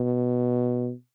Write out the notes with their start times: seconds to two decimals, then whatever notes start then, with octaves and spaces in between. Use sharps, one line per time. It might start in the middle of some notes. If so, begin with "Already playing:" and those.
Already playing: B2